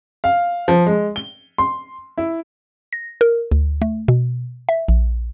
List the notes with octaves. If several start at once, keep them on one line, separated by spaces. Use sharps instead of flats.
F5
F3
G#3
G7
C6
E4
A#6
A#4
D2
A3
B2
E5
A#1